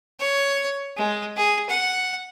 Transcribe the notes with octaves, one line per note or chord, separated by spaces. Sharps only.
C#5
G#3
G#4
F#5